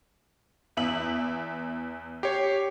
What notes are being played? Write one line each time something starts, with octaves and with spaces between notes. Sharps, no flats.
E2 E5 F#7
G4 C#5 C7